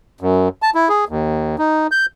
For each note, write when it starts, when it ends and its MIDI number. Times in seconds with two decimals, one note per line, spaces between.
0.21 0.48 42
0.62 0.70 81
0.75 0.89 64
0.89 1.05 68
1.09 1.56 39
1.58 1.87 63
1.91 2.06 91